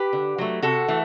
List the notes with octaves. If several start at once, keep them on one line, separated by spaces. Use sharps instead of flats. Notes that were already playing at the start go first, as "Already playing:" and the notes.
Already playing: G4 B4
D3
F#3 A3
C3 F#4 A4
E3 A3